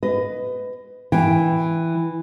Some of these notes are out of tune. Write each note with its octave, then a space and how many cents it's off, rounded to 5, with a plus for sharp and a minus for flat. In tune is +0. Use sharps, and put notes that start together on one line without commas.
B4 +25 D#5 +0
E3 +0 G5 +0